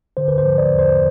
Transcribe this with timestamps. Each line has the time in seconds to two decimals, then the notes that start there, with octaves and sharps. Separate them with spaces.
0.17 D3 C5
0.28 B4
0.38 C5
0.45 F3
0.58 D5
0.73 E2
0.79 C5